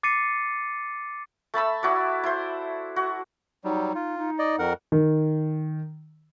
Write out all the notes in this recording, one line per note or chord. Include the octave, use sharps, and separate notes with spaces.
D6 A6 C7 C#7 D#7
A3 A5 B5 E6
E4 F#4 D5
E4 C5
F#4
F#3 G3 D#4
F4
D#4
D5 D#5
F2 A#4 F#5
D#3